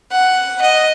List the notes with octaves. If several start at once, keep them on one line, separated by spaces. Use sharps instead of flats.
F#5
D#5